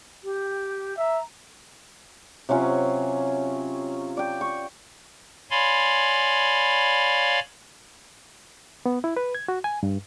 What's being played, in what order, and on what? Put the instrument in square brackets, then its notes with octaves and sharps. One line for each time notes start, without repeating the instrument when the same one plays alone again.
[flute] G4
[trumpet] E5 [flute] A#5
[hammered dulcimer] C3 F#3 C#4 F4
D5 G5
C#6
[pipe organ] C#5 D5 F5 G#5 B5 C6
[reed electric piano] B3
E4
B4
G#6
F#4
G#5
G2